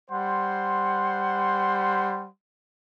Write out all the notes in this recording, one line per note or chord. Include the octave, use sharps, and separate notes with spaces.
G3 C5 F#5 C6